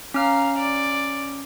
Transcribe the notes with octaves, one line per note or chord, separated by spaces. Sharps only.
C#4 F5 A#5 F6
D5